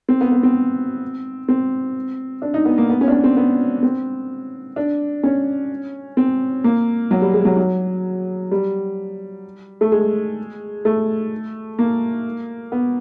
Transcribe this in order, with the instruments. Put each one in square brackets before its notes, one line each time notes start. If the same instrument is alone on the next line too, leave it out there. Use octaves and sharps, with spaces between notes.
[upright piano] C4
B3
B3
C4
C4
D4
D#4
B3
A#3
B3
C#4
D4
C#4
C4
B3
C4
D4
C#4
C4
A#3
F#3
G3
G#3
F#3
F#3
G3
A3
G#3
A3
A#3
B3